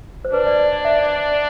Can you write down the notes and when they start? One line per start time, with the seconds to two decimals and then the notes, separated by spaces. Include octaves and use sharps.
0.25 C5
0.33 D4 B4
0.47 D5
0.60 D5
0.72 D5
0.85 E5
0.98 D5